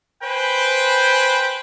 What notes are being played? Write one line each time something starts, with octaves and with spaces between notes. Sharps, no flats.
B4 C5 G5 G#5